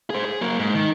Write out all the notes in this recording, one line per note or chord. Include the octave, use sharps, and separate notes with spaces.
G#4 C5
G#4
F#3 A#3
G#2
D#3